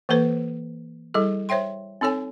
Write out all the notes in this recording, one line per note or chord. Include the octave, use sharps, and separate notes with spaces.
E3 A#3 A4 B4 C5
G3 E4 G#4 A4
C5 C#5 E5 G5 C6
C4 D#4 A4 C#5 G#5